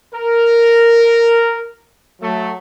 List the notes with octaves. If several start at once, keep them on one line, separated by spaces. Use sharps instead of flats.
A#4
F#3 A3